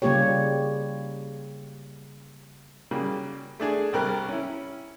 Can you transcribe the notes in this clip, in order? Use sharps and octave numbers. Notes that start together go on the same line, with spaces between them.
C#3 G3 A#3 F4 G4 C#5
C#3 F#3 G3 A#3
A3 D4 G#4
C2 G3 A#4 F#6
C#4 E4